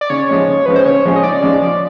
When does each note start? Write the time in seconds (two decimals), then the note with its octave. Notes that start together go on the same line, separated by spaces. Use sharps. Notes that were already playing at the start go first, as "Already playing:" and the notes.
0.01 D5
0.10 C#3 C#5
0.29 F3 G#3 C#4
0.48 C#3
0.66 F3 G#3 C#4 B4
0.76 C5
0.86 C#3 C#5
1.05 F3 G#3 C#4
1.16 D#5
1.23 C#3 D5
1.42 F3 G#3 C#4
1.61 F3